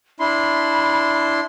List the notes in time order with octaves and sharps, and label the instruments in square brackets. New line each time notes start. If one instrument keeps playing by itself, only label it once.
[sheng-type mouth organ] D4 E4 C6 [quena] B5